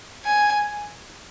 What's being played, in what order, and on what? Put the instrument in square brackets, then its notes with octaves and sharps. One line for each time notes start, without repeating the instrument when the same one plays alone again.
[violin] G#5